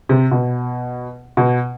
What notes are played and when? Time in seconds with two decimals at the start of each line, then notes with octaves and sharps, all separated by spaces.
0.09 C3
0.31 B2
1.37 B2